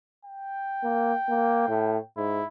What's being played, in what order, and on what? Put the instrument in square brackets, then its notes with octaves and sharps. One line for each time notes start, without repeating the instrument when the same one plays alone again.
[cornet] G5
[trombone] A#3
A#3
A2
[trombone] G#2 [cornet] E4